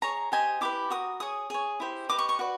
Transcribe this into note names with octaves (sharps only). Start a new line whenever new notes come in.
G#4 C#5 A#5
G4 C5 D#5 G#5
E4 G4 B4 D6
F#4 A#4 D#6
G#4 C#5 D#6
G#4 C#5
E4 G4 C5
G4 B4 D#5 D6
C#6
C#6
F#4 B4 D5